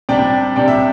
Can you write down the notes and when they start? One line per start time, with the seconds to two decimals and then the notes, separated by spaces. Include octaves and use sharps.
0.09 C3 G3 D4 D5 G5
0.56 C3 G3 D4 G5
0.68 E5